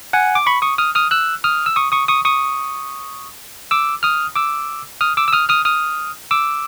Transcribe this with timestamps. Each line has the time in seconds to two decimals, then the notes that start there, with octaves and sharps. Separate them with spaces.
0.13 F#5 G#5
0.35 D6
0.46 B5 C#6
0.62 C#6 D#6
0.78 D#6 F6
0.95 D#6 F6
1.11 E6 F#6
1.44 D#6 F6
1.66 E6
1.76 C#6 D#6
1.92 C#6 D#6
2.08 C#6 D#6
2.25 C#6 D#6
3.71 D6 E6
4.03 D#6 F6
4.36 D6 E6
5.01 D#6 F6
5.17 D6 E6
5.28 E6
5.33 D#6 F6
5.49 D#6 F6
5.65 D#6 F6
6.31 D6 E6